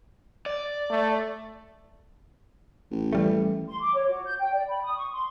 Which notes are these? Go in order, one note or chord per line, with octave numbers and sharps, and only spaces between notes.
D5
A3
A1
E3 G3 A3
C6
D6
C#5
F#4
G6
G5
D5
B5
D#6
C#6
C6